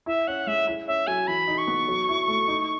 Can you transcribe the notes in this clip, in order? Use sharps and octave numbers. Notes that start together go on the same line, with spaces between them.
E4 E5
C#4 F#5
G#3 E5
E4
C#4 E5
F#3 G#5
E3 B5
D#4
C#6
B3
F#3
E4
A3
D#4